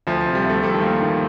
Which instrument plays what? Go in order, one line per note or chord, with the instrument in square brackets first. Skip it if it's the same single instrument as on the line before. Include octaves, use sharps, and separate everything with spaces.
[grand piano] D2 [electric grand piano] F3
[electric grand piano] F3
[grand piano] C3
[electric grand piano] G3
[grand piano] D2
[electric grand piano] A3
[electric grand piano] G3 [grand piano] A4
[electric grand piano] D#3
[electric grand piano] F3 [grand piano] A#3
[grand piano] D#3